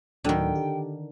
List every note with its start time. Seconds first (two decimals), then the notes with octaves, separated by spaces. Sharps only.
0.24 D2 A2 D3 D#3 F#3 G5
0.55 G4